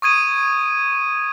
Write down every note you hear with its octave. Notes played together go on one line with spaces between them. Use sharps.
C#6 D#6 G#6 D#7